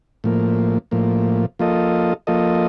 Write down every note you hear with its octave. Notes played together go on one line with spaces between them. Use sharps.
A2 F3 A#3
A2 F3 A#3
F3 A#3 F4 A4 D#5
F3 A#3 F4 A4 D#5